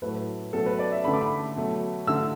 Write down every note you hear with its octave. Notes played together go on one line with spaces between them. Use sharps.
A2 F#3 A3 B4
B2 F#3 A3 A4
B4
D5
E5
D3 A3 B5
D6
B5
B2 F#3 A3
D3 A3 E6